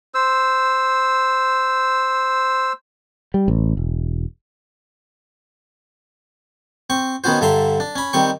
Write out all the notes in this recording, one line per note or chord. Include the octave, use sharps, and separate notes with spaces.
C5 E6
G3
A1
E1
C4 C#6
D#3 B3 C#4 F#4 C5
G2 D3 E5 A#5 C6
D4
C#4 B5
D#3 G3 C4 C#6